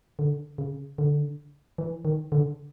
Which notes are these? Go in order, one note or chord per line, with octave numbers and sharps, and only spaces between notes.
D3
C#3
D3
E3
D#3
D3